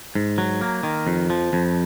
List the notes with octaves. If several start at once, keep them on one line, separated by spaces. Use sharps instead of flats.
G#2
F#3
A#3
D#3
F2
F3
F2